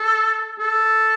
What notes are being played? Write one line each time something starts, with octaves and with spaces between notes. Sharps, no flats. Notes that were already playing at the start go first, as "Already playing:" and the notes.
Already playing: A4
A4